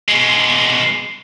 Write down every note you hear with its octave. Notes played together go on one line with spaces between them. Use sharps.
B2 G#3